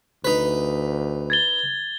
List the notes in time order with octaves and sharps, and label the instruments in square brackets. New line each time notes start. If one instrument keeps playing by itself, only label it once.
[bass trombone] D2 [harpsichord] D#4 B4
[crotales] G#6 A6 G7